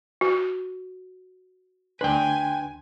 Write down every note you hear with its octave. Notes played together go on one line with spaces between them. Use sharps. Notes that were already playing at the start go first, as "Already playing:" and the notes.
F#4
D2 D4 B4 G5 G#5 C6